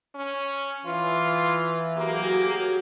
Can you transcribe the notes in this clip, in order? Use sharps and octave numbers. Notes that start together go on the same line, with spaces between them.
C#4
E3 F4
F#3 A#3 G4 G#4